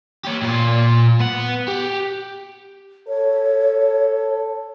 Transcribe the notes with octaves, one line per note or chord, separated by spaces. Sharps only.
G4 C#5
A#2 F4
B3 F#5
G4
A4 C#5